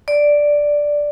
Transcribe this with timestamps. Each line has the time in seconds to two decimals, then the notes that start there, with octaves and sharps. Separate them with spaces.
0.08 D5